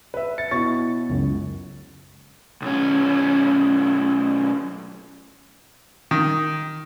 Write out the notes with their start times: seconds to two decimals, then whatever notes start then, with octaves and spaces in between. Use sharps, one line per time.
0.14 B4 E5
0.38 A6 C#7
0.51 B2 E4 C#5 C#6 A6
1.09 C#2 F#2 C#3
2.62 B1 C#4
6.11 D#3